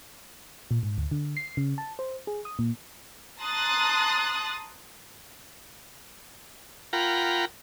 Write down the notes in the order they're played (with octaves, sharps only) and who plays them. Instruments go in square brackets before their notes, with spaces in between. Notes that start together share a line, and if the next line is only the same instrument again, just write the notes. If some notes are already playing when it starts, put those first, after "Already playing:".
[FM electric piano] A#2
G#2
D2
D3
C7
C#3
A5
C5
G#4
D#6
A#2
[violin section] A5 A#5 C6 D#6 F#6 A6
[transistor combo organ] F4 A#4 F#5 G5 A#5 B5